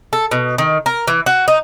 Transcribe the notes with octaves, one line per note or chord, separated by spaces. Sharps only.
A4
B2
D#3
A#4
E3
F#4
D#4